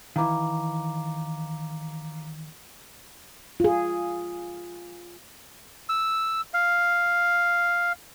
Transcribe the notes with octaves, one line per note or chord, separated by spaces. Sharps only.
D#3 E3 F5 A#5 D6
F4 G#4
E6
F5